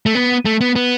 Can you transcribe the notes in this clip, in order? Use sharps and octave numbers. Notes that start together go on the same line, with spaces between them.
A3
B3
A3
B3
B3